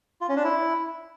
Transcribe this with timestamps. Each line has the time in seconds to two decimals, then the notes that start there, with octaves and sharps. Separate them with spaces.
0.21 F4
0.29 C#4
0.37 D4
0.44 E4